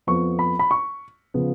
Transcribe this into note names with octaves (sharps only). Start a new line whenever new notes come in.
F2 F3 B3 C#6
B5
B5
C#6
C#3 F3 B3